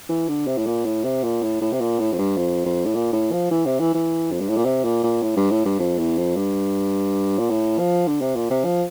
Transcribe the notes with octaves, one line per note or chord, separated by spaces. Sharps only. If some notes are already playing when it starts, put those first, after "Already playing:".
E3
D3
C3
A2
A#2
A2
C3
A#2
A2
A2
C3
A#2
A2
F2
G2
F2
F2
A2
A#2
A2
F3
E3
C3
E3
E3
F2
G2
A2
A#2
C3
A#2
A#2
A2
G2
A2
G2
F2
E2
F2
G2
A#2
A2
F3
D3
C3
A#2
C3
F3